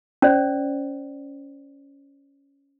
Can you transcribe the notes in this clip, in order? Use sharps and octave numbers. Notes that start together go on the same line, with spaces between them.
C#4 C5 D5